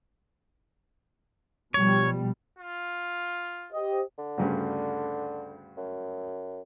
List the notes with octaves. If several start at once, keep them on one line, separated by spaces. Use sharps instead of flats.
B2 F3 G3 C#5
F4
G4 C5 D#5
D3
D2 G2 C#3
F#2